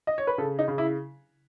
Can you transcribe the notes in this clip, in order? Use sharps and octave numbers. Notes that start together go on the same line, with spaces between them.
D#5
C#5
B4
C#3 A4
D#4
C#3
E4